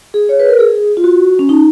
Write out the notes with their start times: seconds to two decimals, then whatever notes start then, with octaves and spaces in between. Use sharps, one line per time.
0.14 G#4
0.29 C#5
0.40 B4
0.49 A#4
0.59 G#4
0.97 F4
1.04 F#4
1.39 C#4
1.49 D#4